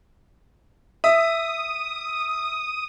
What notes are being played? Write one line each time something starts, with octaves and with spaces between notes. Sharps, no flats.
E5 D#6